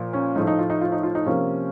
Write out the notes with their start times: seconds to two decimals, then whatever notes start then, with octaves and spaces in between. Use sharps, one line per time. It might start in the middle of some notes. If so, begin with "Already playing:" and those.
Already playing: A#2 F3
0.13 C#4
0.35 A2 F3 A3 D#4
0.47 D#4
0.59 F4
0.70 D#4
0.81 F4
0.92 D#4
1.03 F4
1.15 D#4
1.26 C3 F3 A#3 C#4